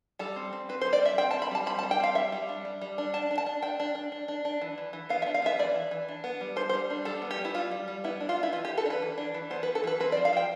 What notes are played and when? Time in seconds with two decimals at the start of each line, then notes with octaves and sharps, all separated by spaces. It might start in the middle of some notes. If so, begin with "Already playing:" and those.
0.19 G3 A4
0.36 C4
0.53 C4
0.69 C4 B4
0.81 C5
0.85 G3
0.93 D5
1.02 C4 E5
1.18 C4 G5
1.31 A5
1.34 C4
1.42 B5
1.51 G3 A5
1.66 C4 B5
1.79 A5
1.83 G3
1.91 G5
2.00 C4 F5
2.15 G3 E5
2.32 G3
2.49 D4
2.65 G3
2.81 G3
2.98 D4
3.14 D4 A5
3.31 D4
3.38 A5
3.46 D4
3.62 D4 G5
3.80 D4
3.95 D4
4.12 D4
4.28 D4
4.45 D4
4.61 E3
4.78 E3
4.93 E3
5.09 B3 F5
5.22 E5
5.26 D4
5.34 F5
5.42 B3 E5
5.59 E3 D5
5.76 E3
5.91 E3
6.08 D4
6.24 B3
6.41 G3
6.56 D4 C5
6.69 C5
6.73 G3
6.90 D4
7.05 G3 A4
7.22 B3
7.31 G4
7.39 G3
7.45 E4
7.54 G3 F4
7.72 G3
7.88 G3
8.04 B3 E4
8.20 D4
8.29 F4
8.37 B3
8.43 E4
8.53 E3 F4
8.65 G4
8.69 E3
8.78 A4
8.86 D4
8.90 B4
9.02 E3
9.18 D4
9.34 E3
9.50 B3 C5
9.63 B4
9.67 E3
9.75 A4
9.84 E3 B4
10.00 C4 B4
10.12 D5
10.17 F3
10.25 F5
10.33 F3 G5